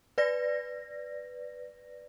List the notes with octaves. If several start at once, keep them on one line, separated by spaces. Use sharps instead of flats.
B4 D5 A#6